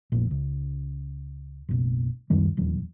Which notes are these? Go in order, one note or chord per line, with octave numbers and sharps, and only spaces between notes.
F1 A#1
C#2
F#1 B1
C#2 F#2 D#3 G3
D#1 E2 F#3